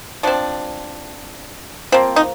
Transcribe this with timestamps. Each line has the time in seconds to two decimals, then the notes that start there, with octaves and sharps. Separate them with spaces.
0.23 F3 C4 D4
1.92 F3 A#3 C4
2.16 D#4